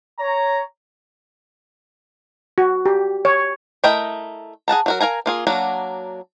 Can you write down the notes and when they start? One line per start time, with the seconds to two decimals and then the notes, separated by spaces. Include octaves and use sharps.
0.20 C#5 A#5
2.58 F#4
2.86 G4
3.25 C#5
3.84 A3 E4 A#4 D#5 G5
4.68 G#4 F#5 A5 A#5
4.86 F#3 F#4 A#4
5.01 A#4 F5 G#5 A#5
5.26 A#3 F4 G#4
5.47 F#3 A#3 D4 F#4